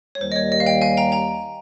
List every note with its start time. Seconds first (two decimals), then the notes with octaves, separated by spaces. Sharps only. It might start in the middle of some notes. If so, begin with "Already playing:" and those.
0.15 C#5
0.20 D#2 D#3 G3 C5
0.32 D#5
0.36 C#5
0.52 D#5
0.60 F5
0.66 D#5 G5
0.81 F5 G#5
0.97 G5 A#5
1.12 G5 A#5